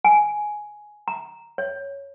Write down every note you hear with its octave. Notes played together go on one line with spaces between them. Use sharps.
G#5
A#5
C#5